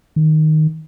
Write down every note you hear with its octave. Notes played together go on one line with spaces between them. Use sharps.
D#3